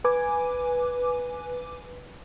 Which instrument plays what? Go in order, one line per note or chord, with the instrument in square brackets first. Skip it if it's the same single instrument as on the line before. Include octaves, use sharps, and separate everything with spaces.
[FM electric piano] B4 G#5 D6